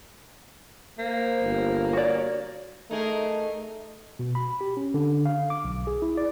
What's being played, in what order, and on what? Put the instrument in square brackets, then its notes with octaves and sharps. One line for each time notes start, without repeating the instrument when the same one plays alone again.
[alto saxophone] A#3 [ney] C5
[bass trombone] G1
[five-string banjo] F#4 D5 [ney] C#5
[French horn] A3 [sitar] D#4 G#4 A#4
[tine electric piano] B2
B5
G4
C#4
D3
F5
D6
B1
G#4
E4
D5